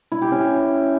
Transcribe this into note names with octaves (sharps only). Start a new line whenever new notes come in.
E4
G4
C#4